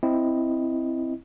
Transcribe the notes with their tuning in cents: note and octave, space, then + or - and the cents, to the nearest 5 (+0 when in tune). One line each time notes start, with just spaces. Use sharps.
C4 +0 E4 +0 D#5 +0